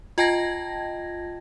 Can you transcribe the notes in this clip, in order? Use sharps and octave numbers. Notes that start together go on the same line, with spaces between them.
F4 D#5 G5 A5 G#6 A#6